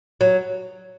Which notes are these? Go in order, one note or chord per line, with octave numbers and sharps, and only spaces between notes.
F#3